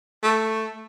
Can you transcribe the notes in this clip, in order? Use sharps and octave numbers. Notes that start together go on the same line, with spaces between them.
A3